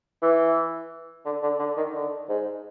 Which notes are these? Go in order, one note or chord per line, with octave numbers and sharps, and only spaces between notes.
E3
D3
D3
D3
D#3
D3
G#2